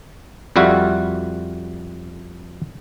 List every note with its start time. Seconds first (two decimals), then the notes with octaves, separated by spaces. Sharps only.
0.56 F2 G3 E4 F#4 F5